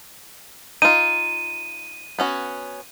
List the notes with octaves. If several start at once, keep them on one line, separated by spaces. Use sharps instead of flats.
D#4 F4 D#7
B3 C#4 F#4